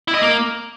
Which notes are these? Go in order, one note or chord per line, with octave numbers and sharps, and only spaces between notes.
E4
D#5
A#3